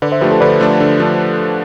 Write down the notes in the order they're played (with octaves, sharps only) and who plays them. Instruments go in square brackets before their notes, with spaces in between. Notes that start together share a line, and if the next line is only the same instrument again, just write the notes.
[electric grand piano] D3 [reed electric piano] B4 D5
[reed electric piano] C5 E5
[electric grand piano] F3 A3 D4 [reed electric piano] G4 B4
[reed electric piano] A4 C5
[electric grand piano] D3 [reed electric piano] B4 D5
[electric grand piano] F3 A3 D4
D3
F3 A3 D4